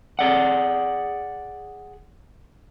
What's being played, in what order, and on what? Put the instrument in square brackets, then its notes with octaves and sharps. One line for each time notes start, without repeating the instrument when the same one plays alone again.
[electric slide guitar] G#4 D5 F#5